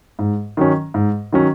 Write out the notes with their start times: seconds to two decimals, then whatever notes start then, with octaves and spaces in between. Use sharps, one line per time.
0.19 G#2
0.57 D#3 F#3 C#4
0.94 G#2
1.32 D#3 F#3 C#4